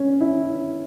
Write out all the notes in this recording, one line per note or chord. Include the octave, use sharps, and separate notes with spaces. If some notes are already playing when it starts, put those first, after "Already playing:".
Already playing: C#4
E4